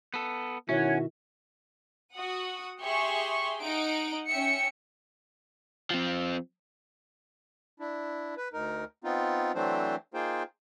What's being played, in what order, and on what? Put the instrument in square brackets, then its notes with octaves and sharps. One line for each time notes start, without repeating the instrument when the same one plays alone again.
[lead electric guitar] B3 A4
[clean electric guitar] B2 F#4 E5 [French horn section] D#3 E4 [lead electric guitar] C#4 [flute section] C#5 F#5
[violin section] F#4 F#5 D#6
G4 G#4 E5 C6 C#6
D#4 F#5 D7
C#4 E5 G5 C#7
[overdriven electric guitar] F3 C4
[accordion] D4 E4
B4
D2 D#4 A#4
B3 C4 D#4 F4
E3 F#3 A3 C4 D4 C5
A#3 D#4 F4 G#4 C5 G5